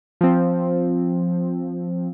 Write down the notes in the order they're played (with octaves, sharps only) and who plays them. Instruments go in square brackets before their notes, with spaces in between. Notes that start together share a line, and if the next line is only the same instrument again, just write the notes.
[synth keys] F3 C4